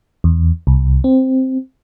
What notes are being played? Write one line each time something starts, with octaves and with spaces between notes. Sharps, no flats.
E2
C2
C4